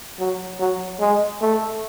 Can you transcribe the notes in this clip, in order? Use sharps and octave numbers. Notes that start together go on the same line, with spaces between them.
F#3
F#3
G#3
A3